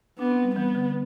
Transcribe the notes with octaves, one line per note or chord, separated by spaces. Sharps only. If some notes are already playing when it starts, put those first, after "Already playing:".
B3 D4
C4
G3
E3 B3
D3